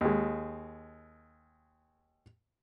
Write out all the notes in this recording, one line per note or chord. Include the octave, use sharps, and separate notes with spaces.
D#2 G#3